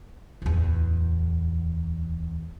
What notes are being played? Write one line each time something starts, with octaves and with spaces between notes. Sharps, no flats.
D1 E2